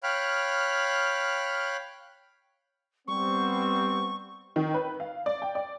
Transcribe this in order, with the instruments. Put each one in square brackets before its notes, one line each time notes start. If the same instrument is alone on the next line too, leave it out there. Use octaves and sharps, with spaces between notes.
[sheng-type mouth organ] C#5 F5 G5 B5 F6 F#6
[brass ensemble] G3 B3 C4 [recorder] C#6
[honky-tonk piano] D#3
B4
F5
D5
G5
D5